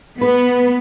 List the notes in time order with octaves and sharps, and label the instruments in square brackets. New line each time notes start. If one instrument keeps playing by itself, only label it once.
[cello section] B3 [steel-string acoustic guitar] B4